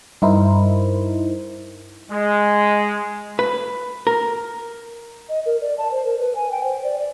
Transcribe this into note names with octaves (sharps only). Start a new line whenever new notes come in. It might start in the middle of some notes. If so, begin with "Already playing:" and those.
G2 D#4 E4 A#4 C5
G#3
B4
A#4
D#5
A#4
D5
A5
C5
A#4
B4
G#5
G5
C5
D5
D5